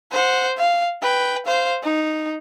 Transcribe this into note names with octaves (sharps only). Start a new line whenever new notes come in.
C5 F#5
F5
B4 G5
C5 F5
D#4